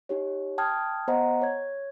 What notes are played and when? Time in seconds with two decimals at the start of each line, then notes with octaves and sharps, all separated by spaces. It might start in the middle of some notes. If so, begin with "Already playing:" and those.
0.09 D#4 G4 C#5
0.58 G5 A5 D#6 F6 G#6
1.08 B3 C5 D#5 F#5 A#5
1.41 C#5 G#6